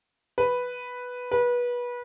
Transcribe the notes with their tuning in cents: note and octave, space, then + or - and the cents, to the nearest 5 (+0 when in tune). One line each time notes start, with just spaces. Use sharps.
B4 +0
B4 -25